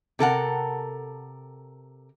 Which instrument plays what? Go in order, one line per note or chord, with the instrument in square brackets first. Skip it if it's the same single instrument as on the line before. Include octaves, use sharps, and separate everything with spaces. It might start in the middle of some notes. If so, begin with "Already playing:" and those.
[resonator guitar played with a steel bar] C3 A4 A#4 F#5